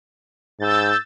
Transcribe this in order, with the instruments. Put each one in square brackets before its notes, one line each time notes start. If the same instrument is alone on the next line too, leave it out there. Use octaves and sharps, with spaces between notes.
[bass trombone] G#2 [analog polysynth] E6 G6 A6